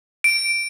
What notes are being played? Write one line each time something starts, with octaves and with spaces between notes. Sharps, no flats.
D7